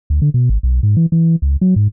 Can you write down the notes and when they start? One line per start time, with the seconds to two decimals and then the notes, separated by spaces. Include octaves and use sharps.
0.10 D2
0.22 D3
0.34 B2
0.49 G#1
0.63 B1
0.83 G#2
0.97 E3
1.12 E3
1.42 C#2
1.61 F#3
1.76 G#2